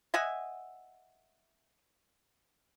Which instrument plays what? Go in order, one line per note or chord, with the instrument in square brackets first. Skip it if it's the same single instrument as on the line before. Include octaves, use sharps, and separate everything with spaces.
[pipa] D#5 E5 F#5 G#5